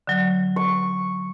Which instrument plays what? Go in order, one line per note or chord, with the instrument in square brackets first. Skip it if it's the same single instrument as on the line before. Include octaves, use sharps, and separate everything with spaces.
[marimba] D3 F#3
[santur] C#6